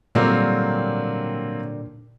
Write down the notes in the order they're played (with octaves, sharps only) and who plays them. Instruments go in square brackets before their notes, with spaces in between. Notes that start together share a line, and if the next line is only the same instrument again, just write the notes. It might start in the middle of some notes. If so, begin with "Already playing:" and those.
[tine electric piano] A#2 [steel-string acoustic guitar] D3 G3 A#4 [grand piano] F#3 A#3 C4